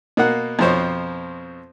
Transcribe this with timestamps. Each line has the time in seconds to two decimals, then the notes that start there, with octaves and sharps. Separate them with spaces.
0.17 B2 A#3 F#5
0.59 F2 B2 F3 C5 C#5